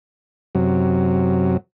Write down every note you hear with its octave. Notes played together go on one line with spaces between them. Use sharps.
F#2 C3 F#3